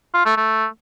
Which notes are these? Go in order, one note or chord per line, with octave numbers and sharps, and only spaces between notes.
F4
A3
A3